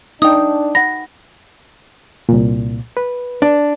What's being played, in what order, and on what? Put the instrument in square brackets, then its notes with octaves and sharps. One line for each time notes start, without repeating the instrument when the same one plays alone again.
[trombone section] D4 [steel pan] D#4 G5 [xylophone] D#6
[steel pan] F#5 B5 [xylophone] A#6
[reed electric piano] C2 A#2
B4
[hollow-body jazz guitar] D4